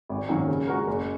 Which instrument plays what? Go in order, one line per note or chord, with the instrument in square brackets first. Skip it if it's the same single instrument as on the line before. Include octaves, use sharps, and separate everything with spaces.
[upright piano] G#1
F#2 D#3 F#3 A#3
C#3
G#3 F#4 A#4
F#1